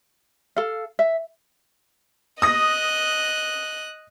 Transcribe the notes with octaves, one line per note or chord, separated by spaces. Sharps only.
A4 F5
E5
D#5 D#6 F#6 A#6